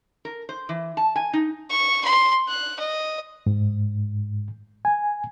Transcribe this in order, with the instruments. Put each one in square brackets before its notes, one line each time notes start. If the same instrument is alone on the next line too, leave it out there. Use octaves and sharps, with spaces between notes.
[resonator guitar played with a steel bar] A#4
C5
E3
A5
G#5
D#4
[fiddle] C#6
C6
F#6
D#5
[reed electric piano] G#2
G#5